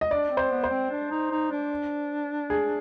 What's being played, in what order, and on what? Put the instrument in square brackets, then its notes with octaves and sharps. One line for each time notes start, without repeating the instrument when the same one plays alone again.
[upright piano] D#5
[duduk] D4 [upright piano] D5
[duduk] C4
[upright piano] C5
[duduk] B3
[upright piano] C5
[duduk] C4
D4
D#4
D#4
D4
[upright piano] G#4